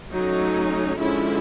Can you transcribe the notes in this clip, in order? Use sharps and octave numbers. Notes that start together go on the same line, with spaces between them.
F#3 A3 C#4 D#4
D3 F3 G#3 C#4 E4